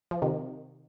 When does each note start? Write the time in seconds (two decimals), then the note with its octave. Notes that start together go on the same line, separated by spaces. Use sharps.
0.11 F3
0.22 C3 D#3